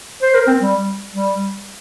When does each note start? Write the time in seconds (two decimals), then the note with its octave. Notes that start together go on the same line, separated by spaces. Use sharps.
0.22 C5
0.35 A#4
0.47 C4
0.60 G3
1.11 G3